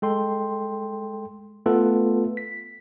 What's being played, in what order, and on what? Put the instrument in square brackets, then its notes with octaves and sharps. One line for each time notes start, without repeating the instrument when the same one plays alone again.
[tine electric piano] G#3 A4 G5 C6
A3 B3 F4 A4 B4
B6